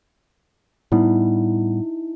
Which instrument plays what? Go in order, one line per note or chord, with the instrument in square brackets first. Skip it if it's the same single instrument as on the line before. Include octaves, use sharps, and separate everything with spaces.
[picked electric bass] A2 G3 B3 [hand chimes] D#4 E4